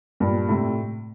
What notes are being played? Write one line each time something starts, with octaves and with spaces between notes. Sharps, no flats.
G2 A#2
A2 C3